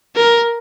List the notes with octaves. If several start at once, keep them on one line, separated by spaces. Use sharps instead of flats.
A#4